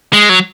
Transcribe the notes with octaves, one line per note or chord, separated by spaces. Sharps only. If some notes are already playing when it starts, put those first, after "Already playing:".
G#3
F#3